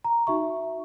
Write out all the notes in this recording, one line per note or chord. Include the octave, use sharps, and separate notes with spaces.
A#5
D#4 F#4 E5 C#6